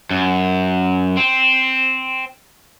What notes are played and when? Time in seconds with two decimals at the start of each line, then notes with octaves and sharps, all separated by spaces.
0.10 F#2
1.17 C4